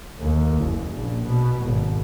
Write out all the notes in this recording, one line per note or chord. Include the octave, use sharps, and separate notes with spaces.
D#2
F#1
A#1
B2
G#1